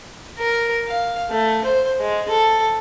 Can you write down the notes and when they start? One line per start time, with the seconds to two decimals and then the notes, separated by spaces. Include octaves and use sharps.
0.38 A#4
0.88 F5
1.31 A3
1.64 C5
2.00 G#3
2.29 A4